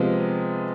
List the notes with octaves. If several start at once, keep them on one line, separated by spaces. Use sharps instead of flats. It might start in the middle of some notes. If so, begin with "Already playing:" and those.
Already playing: C3 F3 G#3 B3